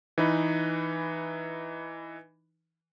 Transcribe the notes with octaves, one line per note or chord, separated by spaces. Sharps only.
E3 D#4 B4